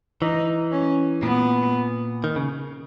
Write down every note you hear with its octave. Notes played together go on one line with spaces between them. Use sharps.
E3 D#4
C#4
A#2 B3
D#3
C#3